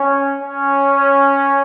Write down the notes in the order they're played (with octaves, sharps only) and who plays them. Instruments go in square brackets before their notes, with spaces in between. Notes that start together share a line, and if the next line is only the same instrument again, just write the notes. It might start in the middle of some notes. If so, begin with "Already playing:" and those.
Already playing: [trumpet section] C#4
C#4